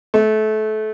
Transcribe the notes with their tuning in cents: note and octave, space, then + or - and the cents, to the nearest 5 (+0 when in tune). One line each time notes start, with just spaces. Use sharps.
A3 -25